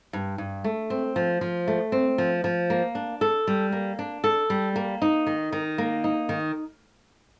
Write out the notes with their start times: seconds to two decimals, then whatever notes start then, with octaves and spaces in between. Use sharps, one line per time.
0.13 G2
0.38 G2
0.64 A3
0.90 C4
1.16 F3
1.41 F3
1.67 A3
1.92 C4
2.18 F3
2.44 F3
2.70 A#3
2.95 D4
3.21 A4
3.47 G3
3.72 A#3
3.99 D4
4.24 A4
4.50 G3
4.76 A#3
5.02 D#4
5.27 D#3
5.52 D#3
5.78 A#3
6.04 D#4
6.29 D#3